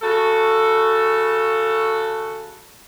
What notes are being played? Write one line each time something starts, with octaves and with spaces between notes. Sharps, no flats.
C#3 F#4 A4